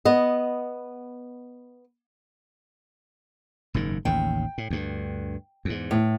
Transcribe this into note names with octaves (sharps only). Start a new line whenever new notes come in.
B3 D#5
F#1 G#2 D#3
A1 D#2 C#3 G5
A2
D2 G2
E2 G#2
A2